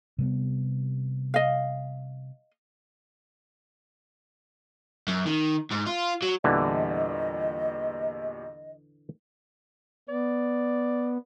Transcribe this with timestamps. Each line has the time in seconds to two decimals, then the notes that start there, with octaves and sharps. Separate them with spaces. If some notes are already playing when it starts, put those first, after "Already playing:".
0.18 C3 G3 B3
1.34 D#5 F5
5.08 F#2
5.26 D#3
5.71 G#2
5.87 F4
6.22 F#3
6.44 E2 A#2 D3 E3 G3 D#5
10.09 B3 D5